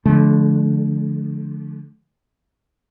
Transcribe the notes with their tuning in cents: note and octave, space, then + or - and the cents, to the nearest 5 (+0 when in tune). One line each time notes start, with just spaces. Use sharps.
D3 +0 F3 -5 A3 -35